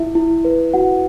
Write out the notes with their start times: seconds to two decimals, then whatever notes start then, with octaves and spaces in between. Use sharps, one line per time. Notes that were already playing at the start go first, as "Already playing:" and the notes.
Already playing: E4 E5
0.15 E4
0.45 B4
0.74 F#4 F#5